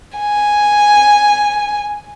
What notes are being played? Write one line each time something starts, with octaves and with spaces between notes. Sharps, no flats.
G#5